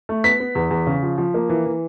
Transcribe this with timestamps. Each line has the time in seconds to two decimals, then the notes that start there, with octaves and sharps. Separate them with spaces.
0.09 A3
0.24 B3 B6
0.40 B3
0.55 E2
0.71 E2
0.87 C#3
1.03 F3
1.18 F3
1.34 A#3
1.49 E3
1.66 E3